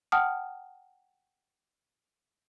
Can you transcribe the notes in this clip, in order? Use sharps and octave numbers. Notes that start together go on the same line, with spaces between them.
F#5 G5 A5 D#6 F6